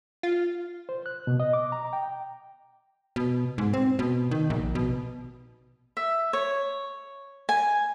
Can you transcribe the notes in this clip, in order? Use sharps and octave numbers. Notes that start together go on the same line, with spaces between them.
F4
C5
F#6
B2
D#5
D6
A#5
G5
B2
G#2
C4
B2
D#3
A#1
B2
E5
C#5
G#5